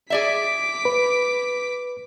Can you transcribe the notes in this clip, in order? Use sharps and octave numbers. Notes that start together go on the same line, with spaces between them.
G#4 D5 E5 D6 B6
B4